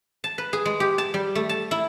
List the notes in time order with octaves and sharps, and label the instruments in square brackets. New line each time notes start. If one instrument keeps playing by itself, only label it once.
[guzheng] A5
B4
G#4
G#3
G4
A5
G3
A3
A5
E4